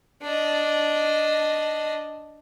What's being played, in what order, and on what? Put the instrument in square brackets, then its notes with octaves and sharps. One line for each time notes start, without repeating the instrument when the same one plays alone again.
[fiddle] D4 D#5